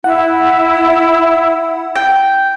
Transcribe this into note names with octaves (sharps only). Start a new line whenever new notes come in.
E4 F#5
G5